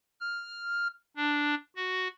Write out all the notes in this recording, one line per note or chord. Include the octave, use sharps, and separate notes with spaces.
F6
D4
F#4